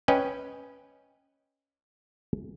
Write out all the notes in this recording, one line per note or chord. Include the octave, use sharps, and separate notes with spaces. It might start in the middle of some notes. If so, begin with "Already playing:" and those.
C#4 B4 D#5 G5